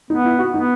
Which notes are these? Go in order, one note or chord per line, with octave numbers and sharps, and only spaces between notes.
B3 D#4
E4
F#4
B3 D#4